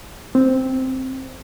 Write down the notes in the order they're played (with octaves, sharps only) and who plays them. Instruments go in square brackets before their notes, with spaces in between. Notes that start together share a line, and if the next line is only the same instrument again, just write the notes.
[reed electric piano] C4